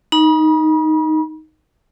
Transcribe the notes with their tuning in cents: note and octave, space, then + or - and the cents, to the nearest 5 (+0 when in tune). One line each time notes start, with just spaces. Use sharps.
D#4 +0 B5 -45